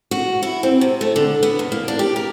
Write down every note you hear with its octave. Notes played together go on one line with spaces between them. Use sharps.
F#4
E4
C4
C3
A3
D3
B3
E2
A#3
D4
G4
A#4